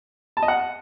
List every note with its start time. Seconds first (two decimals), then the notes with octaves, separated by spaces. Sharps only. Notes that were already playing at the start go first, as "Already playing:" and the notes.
0.37 A5
0.43 D#5
0.48 F#5